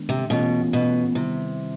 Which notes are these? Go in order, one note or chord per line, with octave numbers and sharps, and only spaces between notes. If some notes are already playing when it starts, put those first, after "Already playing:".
Already playing: D#3 G#3 B3 D4
C3
B2 E3 A3 C#4 F4
B2
C3 D#3 G3 B3 E4